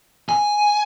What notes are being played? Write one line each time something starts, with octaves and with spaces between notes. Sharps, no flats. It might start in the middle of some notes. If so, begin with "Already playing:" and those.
G#5